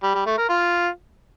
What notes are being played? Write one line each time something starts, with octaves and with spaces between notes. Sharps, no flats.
G3
G3
A3
A#4
F4